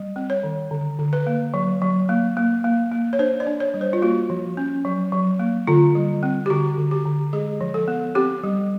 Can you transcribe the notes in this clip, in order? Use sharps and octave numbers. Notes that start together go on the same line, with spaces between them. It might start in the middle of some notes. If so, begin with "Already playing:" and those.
Already playing: G3
C4
C#5
D#3
D3
D3
B4
A#3
F#3
F#3
A#3
A#3
A#3
A#3
C#5
D4 C5
D5
D4
C#5
G3
C5
F4
A#3 F#4
F3
C#4
F#3
F#3
A#3
D3 F4
G3
C4
G4
D3 F#4
D3
G4
D3
G#3 G#4
F3
A4
B3
C4 G4
G3